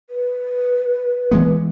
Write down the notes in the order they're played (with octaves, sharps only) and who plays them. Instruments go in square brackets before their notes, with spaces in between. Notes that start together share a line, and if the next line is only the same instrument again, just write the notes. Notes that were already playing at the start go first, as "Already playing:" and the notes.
[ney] B4
[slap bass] E3 G#3 B3